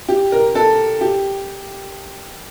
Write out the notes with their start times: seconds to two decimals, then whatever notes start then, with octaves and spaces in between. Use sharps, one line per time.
0.09 G4
0.32 A#4
0.55 A4
1.01 G4